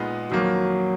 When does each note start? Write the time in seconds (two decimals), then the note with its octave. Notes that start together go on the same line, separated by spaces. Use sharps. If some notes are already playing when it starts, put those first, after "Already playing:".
Already playing: A#2 G#3 B3 D#4
0.31 F2 D#3 F#3 A#3